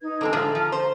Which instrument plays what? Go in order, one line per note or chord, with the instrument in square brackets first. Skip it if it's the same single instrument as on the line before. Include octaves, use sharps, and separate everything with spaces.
[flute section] D#4 B4 G#6
[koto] D3 G#3 C4 [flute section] A5 A#5
[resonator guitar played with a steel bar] A2 [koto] D3 F4 G#4
[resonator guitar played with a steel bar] F3
C5